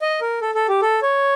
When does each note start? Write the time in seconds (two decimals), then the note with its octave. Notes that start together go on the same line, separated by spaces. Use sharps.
0.02 D#5
0.21 A#4
0.41 A4
0.55 A4
0.69 G4
0.82 A4
1.02 C#5